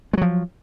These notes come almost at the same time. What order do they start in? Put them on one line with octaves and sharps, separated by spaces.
G#3 F#3 F3